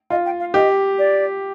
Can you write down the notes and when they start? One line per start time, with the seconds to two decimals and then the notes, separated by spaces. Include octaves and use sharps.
0.10 F4 D#5
0.25 G5
0.40 F5
0.54 G4 D#5
0.98 D5